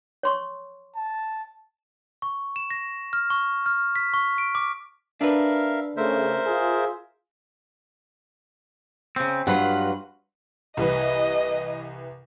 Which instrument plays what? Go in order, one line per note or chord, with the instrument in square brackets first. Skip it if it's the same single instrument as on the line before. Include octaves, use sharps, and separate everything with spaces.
[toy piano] C#5 C6 C#6
[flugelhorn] A5
[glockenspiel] C#6
E7
A#6
F6
C#6
F6
B6
C#6
D7
D6
[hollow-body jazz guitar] D4 B4 [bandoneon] A#4 E5 F5
[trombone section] C#3 A3 [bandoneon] A#4 C5 E5
[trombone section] F4 G#4
[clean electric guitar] C#3 C4
[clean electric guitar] G2 F#3 [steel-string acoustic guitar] F4 B4 F#5
[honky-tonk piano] C2 E3 B4 [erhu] D#5